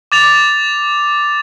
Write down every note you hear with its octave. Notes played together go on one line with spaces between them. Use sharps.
D6 A6 F7